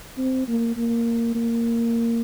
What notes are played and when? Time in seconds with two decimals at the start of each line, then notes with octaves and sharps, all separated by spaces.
0.18 C4
0.48 A#3
0.77 A#3
1.35 A#3